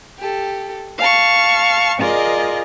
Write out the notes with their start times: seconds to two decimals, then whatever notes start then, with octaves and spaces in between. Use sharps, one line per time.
0.18 G4 A4
0.99 F5 A5 C#6
1.98 F4 G#4 A#4 D5 D#5